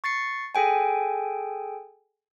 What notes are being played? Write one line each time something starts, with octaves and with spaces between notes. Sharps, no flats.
C#6 A6 C7 C#7
G#4 A4 G5 G#5